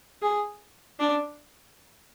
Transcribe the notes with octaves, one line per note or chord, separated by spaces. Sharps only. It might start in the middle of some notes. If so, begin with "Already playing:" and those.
G#4
D4